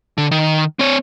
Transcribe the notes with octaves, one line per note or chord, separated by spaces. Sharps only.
D3
D#3
C4 C#5